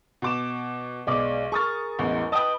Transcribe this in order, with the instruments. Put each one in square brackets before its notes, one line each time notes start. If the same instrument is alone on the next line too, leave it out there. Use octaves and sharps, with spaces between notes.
[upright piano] B2 D6 E7
[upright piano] B1 G#3 [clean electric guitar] D5
[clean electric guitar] G#4 A#4 [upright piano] C#6 D#6 A6
[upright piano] A1 E2 G#3
[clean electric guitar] B4 D#5 [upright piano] G5 A5